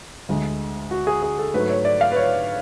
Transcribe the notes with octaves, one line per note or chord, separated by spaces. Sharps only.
D2 D3 G#3
F#4
G#4
G#4
A4
G#2 F#3 A3 B4
C#5
D5
F5
B4
C#5